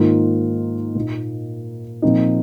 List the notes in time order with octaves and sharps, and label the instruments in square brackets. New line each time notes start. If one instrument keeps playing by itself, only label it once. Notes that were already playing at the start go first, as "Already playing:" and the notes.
Already playing: [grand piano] G#2 D#3 A#3 F4
A#2 A#3 D#4
A#2 F3 C4 D#4